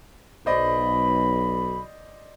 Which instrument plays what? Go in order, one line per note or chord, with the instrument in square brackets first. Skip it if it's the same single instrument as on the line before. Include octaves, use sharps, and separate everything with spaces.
[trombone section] B1 [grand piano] C5 D5 D#5 [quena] B5